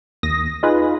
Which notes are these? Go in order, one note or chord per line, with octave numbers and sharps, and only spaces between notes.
D#2 D#6 A#6
D#4 F4 G#4 B4